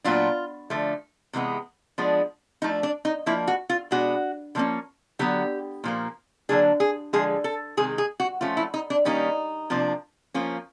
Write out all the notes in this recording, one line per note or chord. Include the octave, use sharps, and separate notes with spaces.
A#2 F#3 B3 D4 F4
D3 F3 A3
C3 E3 G#3 B3
F3 G#3 B3 D4
F3 A3 D4 D#4
D4
D#4
F3 A#3 D4 E4
F#4
F4
B2 G#3 B3 D4 F#4
D3 F3 A#3 C#4
D3 F#3 B3 G4
A#2 F3 A#3
D3 F#3 A#3 D4 G#4
G#4
D3 F3 G#3 G#4
A4
C3 D#3 G#3 G#4
G#4
F#4
F3 A3 C#4 F4
E4
D#4
D4
D#3 G3 A#3 C#4 D#4
C3 F3 A#3 D4
F3 A#3 C#4